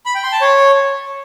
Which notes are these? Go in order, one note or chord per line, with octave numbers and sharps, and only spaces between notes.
B5
G5
C6
A5
C#5